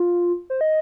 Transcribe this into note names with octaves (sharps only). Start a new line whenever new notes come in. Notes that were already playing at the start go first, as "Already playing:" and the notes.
Already playing: F4
C5
D#5